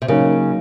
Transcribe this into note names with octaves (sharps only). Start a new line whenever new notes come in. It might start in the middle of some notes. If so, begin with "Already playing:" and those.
C3
C#3 F#3 A#3 D#4 A#4 C#5